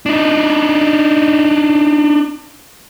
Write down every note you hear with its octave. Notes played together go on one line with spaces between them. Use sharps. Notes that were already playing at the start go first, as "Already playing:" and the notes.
D4 D#4